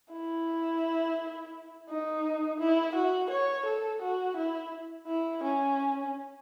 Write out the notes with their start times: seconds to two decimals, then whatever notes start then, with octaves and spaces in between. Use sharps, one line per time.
0.12 E4
1.89 D#4
2.60 E4
2.95 F#4
3.30 C#5
3.65 A4
4.01 F#4
4.36 E4
5.07 E4
5.43 C#4